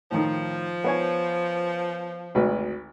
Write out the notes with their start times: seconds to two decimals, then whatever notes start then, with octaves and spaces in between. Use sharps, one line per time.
0.11 A2 D#3 F3
0.84 B3 C#5 G#5
2.35 G#1 D2 B4